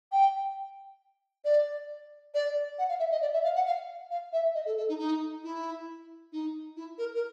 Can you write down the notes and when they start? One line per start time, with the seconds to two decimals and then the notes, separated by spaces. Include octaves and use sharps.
0.12 G5
1.45 D5
2.34 D5
2.79 F#5
2.89 F5
3.00 E5
3.11 D#5
3.22 D5
3.33 E5
3.44 F5
3.55 F#5
3.66 F5
4.11 F5
4.33 E5
4.55 D#5
4.66 A4
4.77 A4
4.89 D#4
4.99 D#4
5.44 E4
6.33 D#4
6.77 E4
6.98 A#4
7.14 A#4